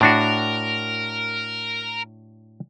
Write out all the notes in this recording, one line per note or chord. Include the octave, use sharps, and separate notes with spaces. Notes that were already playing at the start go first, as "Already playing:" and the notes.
A2 D4 F#4 A#4